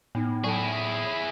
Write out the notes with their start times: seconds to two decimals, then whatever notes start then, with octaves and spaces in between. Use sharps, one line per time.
0.15 A2 B3 D#4
0.44 F#3 E4 G#4 A4 A5